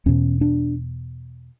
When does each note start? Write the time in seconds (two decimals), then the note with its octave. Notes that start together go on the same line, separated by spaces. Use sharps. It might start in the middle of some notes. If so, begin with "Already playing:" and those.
0.06 E2 B2 C#4
0.41 D4